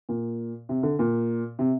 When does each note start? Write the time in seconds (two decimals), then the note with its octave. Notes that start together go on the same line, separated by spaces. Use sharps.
0.09 A#2
0.69 C3
0.83 D3
0.99 A#2
1.59 C3